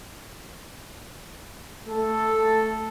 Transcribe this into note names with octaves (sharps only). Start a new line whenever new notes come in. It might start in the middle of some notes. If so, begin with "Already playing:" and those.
A3 A4